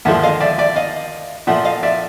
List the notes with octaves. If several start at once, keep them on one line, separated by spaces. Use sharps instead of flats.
D#2 D3 F3 G#3 E5 F#5
D#5 F5
D5 E5
D5 E5
D#5 F5
A#2 F3 A3 E5 F#5
D#5 F5
D5 E5